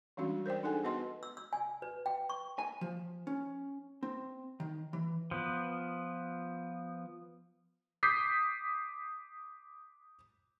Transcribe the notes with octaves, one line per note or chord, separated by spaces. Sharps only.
E3 G3 G#3 C#4 D4 F#4
A#4 C5 D5 G5
D4 D#4 G#4 A4 F#5 G#5
B3 F#4 B4 D#5 F#5 C6
E6
E6
G#5
B4
G5
C#6
G#5
F3
C#4
C4
D#3
E3
F3 B3
D6 D#6 G6 B6 C7